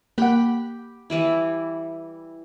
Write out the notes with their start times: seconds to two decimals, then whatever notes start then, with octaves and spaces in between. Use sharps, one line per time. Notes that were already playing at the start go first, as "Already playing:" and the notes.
0.18 A#3 G4 F#5 G5 B5
1.10 E3 G3 E4